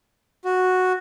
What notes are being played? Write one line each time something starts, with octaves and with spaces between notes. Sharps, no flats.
F#4